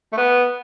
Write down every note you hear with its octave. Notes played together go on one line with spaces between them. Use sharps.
A3
B3